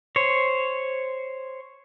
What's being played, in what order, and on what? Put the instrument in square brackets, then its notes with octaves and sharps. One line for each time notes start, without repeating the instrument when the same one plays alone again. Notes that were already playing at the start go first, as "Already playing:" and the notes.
[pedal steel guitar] C5 C#5